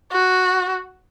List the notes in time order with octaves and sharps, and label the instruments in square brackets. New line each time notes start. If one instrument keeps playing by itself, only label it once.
[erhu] F#4